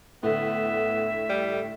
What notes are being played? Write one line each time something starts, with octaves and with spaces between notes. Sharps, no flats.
A2 D3 B3 E5
G3